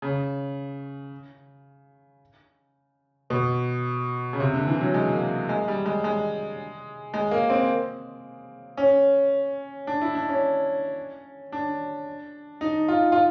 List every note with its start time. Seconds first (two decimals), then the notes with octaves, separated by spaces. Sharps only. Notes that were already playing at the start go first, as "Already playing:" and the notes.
0.02 C#3
3.30 B2
4.33 C#3
4.40 C3
4.54 D3
4.68 E3
4.81 F#3
4.94 G#3
5.13 A#3
5.49 G#3
5.68 G3
5.86 G#3
6.04 G#3
7.14 G#3
7.31 A#3
7.50 C4
8.77 C#4
9.87 D4
10.01 E4
10.15 D4
10.29 C#4
11.52 D4
12.61 D#4
12.88 F4
13.12 F4